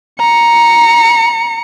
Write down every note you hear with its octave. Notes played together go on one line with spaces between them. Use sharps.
A#5 C#7